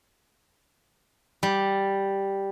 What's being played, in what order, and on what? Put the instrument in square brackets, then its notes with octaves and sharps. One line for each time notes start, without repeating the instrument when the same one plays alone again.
[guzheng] G3